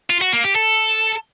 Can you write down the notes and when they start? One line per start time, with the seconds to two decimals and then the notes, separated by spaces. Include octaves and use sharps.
0.10 F4
0.21 F#4
0.33 A#3
0.44 G4
0.55 A4